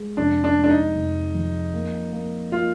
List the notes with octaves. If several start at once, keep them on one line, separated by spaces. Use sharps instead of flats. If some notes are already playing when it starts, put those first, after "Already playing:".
Already playing: G#3
F1 D4
D4
G#3
D4
D#4
F1
F2
A#3
A#3
A#3 F4